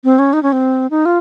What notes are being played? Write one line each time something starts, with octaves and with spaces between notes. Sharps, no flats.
C4
C#4
D#4
C#4
C4
D#4
F4